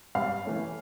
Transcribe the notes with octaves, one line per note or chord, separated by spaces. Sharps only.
G2 F5
E3 A3 C#4